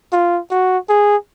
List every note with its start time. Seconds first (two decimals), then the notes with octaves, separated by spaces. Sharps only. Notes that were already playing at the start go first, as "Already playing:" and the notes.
0.13 F4
0.51 F#4
0.89 G#4